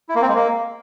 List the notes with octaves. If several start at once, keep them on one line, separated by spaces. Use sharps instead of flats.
E4
A#3
C4
G#3
A#3